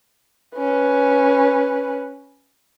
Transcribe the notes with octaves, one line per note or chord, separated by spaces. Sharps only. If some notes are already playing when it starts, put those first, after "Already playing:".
C#4 B4